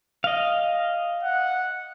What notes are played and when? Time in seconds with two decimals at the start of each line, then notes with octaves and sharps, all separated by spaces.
0.24 D#5 F5
1.23 F#5